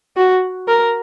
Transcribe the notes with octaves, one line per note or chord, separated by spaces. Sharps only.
F#4
A#4